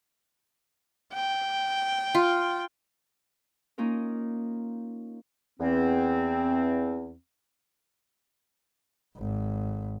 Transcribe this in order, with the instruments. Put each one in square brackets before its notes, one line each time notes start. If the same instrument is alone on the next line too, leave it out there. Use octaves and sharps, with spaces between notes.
[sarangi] G5
[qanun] F4
[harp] A#3 C#4 D#4 F4 A#4
[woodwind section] E2 C4
[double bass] G#1